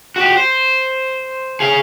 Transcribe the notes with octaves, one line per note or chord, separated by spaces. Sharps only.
F#4 G4
C5
G#4 F5